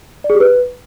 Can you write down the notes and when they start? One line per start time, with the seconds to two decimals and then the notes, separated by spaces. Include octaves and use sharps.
0.24 D5
0.30 G#4
0.35 G4
0.40 B4